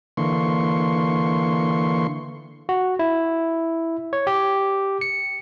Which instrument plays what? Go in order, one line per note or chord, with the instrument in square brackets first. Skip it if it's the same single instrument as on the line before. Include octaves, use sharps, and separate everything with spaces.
[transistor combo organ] D3 E3 A#3 C6 C#6
[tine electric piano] F#4
E4
C#5
G4
C#7